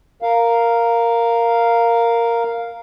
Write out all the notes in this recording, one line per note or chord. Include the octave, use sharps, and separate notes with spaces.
A#4 F5